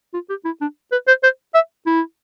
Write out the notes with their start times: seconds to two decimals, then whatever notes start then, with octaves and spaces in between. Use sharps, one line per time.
0.14 F4
0.29 G4
0.45 E4
0.61 D4
0.92 B4
1.07 C5
1.23 C5
1.54 E5
1.86 E4